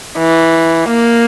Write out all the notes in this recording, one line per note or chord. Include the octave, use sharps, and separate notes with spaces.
E3
A#3